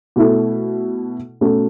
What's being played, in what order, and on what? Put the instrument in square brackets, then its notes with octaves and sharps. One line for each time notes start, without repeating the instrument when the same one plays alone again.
[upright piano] B2 A3 E4 A4
B2 A3 C#4 F#4 A4